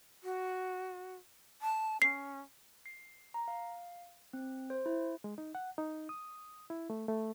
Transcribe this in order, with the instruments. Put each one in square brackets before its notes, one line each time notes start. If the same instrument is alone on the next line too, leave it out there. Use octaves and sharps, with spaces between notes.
[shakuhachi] F#4
A5
[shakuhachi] C#4 [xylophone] C7
[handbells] C7
A#5
F5
C4
C5
E4
[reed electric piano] G#3
D#4
F#5
D#4
D#6
E4
A3
A3